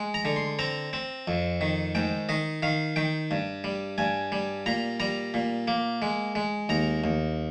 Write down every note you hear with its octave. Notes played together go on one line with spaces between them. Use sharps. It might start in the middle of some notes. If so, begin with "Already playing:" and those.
Already playing: G#3
A#5
D3
C6
C4 A#5
C4
F2
D#3
G#2 G5
D#3 D#5
D#3 F5
D#3 G5
G2
G3
G2 G#5
G3
A#2 A#5
G3 A#5
A#2
A#3
G#3
G#3
D#2 A#5
D#2